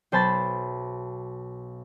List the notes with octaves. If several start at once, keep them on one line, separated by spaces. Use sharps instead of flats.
B1 C5 A5 B5 A6